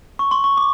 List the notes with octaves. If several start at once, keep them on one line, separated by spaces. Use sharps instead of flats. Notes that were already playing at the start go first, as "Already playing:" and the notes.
C#6
C6
C#6
D6